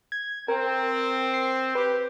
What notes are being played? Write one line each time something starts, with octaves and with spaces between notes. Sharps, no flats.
G#6
C4 A#4
C7
G4 B4